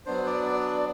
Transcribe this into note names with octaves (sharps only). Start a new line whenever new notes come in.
F#3 B3 D4 C5
D5
D5
D5